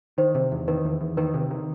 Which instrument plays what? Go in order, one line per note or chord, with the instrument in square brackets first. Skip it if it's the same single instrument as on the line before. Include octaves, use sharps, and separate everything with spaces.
[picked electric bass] D#3 [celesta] C5
[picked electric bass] C3
E2
[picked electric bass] D#3 [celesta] B4
[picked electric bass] E2
E2
[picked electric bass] D#3 [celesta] B4
[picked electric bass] C3
D#3